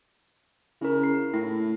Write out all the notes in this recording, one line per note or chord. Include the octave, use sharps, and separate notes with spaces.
C#3 E4 A#4
C7
A2 E4